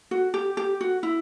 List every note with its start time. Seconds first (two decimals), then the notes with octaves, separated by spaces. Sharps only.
0.11 F#4
0.34 G4
0.57 G4
0.81 F#4
1.03 E4